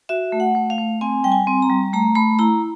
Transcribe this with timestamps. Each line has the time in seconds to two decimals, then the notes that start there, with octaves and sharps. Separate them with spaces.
0.09 F#4 E5
0.32 A3
0.40 F#5
0.55 A3
0.70 F5
0.78 A3
1.01 C4 G#5
1.24 G3 G5
1.32 G#5
1.47 C4
1.62 A#5
1.70 G3
1.93 A3 A#5
2.15 A3 B5
2.39 E4 A#5